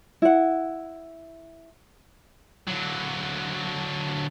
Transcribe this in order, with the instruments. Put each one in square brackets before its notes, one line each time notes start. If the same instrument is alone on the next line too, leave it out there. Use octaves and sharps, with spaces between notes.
[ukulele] E4 F#5
[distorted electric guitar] D3 F#3